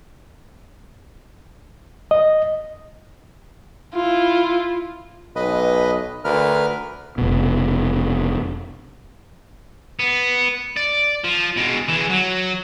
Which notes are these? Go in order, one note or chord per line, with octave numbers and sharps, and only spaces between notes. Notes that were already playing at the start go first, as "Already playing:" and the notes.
D#5
E4 F4
B1 B4 D#5
D2 A#4 B4 F6
F1 B2
B3
D5
F3
B2 G#3
E3 G#3
F#3